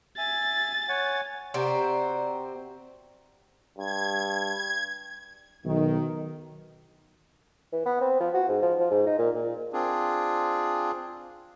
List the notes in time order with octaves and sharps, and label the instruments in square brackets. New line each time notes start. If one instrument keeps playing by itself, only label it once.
[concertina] E5 G#5 [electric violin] A6
[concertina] C#5 F#5 G#5
[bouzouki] C3 C4 F#4 [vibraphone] D5 A#5
[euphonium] G2 [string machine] G#6
[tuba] B1 [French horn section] D#3
[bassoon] E3
B3
C4
F3
F#4
G#2
F3
F3
G#2
D#4
A#2
A#2
[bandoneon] C4 D4 F4 G#4